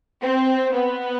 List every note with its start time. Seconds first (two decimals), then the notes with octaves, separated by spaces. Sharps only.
0.23 C4
0.73 B3